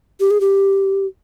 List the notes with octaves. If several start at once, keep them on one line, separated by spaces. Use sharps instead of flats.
G4
G#4
G4